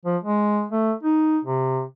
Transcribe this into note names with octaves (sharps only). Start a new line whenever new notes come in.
F3
G#3
A3
D#4
C3